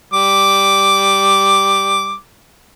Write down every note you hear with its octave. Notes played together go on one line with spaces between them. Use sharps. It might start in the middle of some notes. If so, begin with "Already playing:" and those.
G3 D6